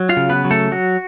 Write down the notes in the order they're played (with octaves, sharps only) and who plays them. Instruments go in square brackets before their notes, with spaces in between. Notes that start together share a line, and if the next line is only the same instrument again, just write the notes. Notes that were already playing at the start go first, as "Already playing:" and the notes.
Already playing: [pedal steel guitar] F#3
F4 F5
C#3
B3 B4
F#3
A3 A4
F#3 F#4